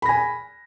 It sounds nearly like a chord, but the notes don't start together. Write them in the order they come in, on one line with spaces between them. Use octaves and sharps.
B5 A#6 G#5